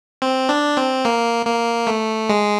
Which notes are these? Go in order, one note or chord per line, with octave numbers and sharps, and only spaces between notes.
C4
D4
C4
A#3
A#3
A3
G#3